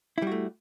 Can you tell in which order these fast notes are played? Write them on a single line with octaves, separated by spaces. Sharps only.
E4 G3 F#4 A3